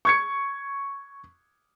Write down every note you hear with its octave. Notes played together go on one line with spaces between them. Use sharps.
C#6 G#6 C#7